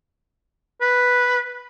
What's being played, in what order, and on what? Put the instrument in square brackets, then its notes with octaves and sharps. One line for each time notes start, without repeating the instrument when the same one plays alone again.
[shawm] B4